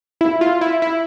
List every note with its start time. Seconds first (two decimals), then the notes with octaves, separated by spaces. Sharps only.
0.21 E4
0.41 F4
0.61 E4
0.82 E4